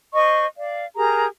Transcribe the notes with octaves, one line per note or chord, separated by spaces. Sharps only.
C5 D#5 C#6
D5 F5
G4 G#4 A#4 A#5